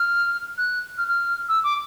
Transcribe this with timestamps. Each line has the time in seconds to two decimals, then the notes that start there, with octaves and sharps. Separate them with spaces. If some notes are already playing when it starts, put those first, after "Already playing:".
Already playing: F6
0.58 F#6
0.98 F6
1.08 F6
1.49 E6
1.64 D6